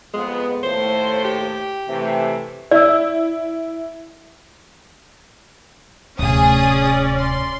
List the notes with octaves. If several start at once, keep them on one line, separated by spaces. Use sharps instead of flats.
F2 G#3 B3
D#2 A2 A3 C5
G4
C3 E3 A3
E4 D5 E6
D1 C3 C#4 G#4 D5 D#6
C6